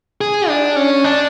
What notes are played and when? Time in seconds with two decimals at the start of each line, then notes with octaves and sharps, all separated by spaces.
0.21 G#4
0.49 D4
0.76 C#4
1.04 D4